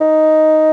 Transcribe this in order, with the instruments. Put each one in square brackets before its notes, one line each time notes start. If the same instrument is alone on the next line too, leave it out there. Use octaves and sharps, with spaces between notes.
[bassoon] D#4